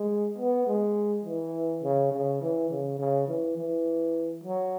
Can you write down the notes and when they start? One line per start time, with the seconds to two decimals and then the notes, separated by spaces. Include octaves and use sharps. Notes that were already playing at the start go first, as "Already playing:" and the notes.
Already playing: G#3
0.38 B3
0.67 G#3
1.25 E3
1.83 C#3
2.12 C#3
2.42 E3
2.70 C#3
2.99 C#3
3.28 E3
3.57 E3
4.44 F#3